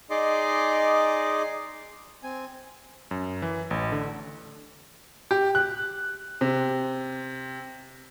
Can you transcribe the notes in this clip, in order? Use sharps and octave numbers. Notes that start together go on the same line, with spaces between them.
D#4 G#4 D5 D#5 C6 D6
C4 G#5
F#2
E3
A1
D3
G4
F#6
C3